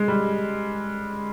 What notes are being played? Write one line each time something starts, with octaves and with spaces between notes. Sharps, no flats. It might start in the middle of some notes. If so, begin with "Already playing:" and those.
Already playing: G#3
G3